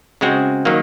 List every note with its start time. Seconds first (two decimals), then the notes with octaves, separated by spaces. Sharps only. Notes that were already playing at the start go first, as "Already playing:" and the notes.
0.21 C#3 G#3 C4 F#4
0.65 D#3 F#3 A#3